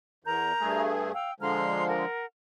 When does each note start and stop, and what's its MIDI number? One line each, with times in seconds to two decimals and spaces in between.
0.24 0.53 40
0.24 0.81 70
0.24 0.81 82
0.24 0.81 91
0.61 1.12 43
0.61 1.12 57
0.61 1.12 68
1.14 1.32 77
1.14 1.32 79
1.14 1.32 88
1.40 2.05 50
1.40 2.05 53
1.40 2.05 56
1.40 1.87 82
1.40 1.87 84
1.40 1.87 89
1.87 2.25 70
1.87 2.25 78